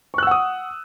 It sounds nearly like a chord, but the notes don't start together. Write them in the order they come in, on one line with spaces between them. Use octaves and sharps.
C#6 F#6 E6 F#5 D#6